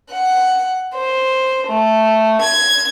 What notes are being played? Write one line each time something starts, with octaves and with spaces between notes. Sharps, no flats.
F#5
C5
A3
G#6